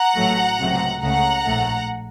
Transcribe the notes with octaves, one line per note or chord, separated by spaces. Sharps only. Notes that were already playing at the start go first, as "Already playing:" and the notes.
Already playing: F#5 A#5
A1 A2 F#3 A3
C#2 C3 F#3 A3
C#2 C#3 A3 F#5 A#5
A#1 A2 A3